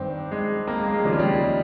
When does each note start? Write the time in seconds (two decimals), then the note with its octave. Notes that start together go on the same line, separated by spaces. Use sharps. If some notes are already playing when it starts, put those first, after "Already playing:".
Already playing: G2 D#3 C4
0.31 G#3
0.67 A#3
0.80 G#3
0.92 G#3
1.05 D#2 C#3 F3 G3
1.13 G#3
1.19 G3